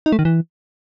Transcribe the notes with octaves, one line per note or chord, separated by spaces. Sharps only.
D#4
A3
D#3
E3